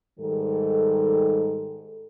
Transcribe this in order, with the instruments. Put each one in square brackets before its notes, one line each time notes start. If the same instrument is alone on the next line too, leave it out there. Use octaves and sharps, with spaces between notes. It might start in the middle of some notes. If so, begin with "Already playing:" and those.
[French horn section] G#2 D#3 G3 A4